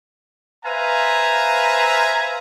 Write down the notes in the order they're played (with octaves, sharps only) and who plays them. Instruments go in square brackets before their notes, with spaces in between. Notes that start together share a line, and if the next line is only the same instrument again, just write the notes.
[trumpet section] B4 C5 E5 F5 G#5 A#5